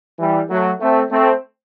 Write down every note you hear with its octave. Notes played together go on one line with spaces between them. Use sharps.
E3 G3
F#3 A3
A3 C4
A3 C4